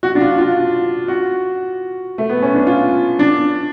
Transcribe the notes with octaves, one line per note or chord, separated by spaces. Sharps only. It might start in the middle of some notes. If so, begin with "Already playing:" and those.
F#4
D4
F4
F4
F#4
A3
B3
C#4
D4
F4
D4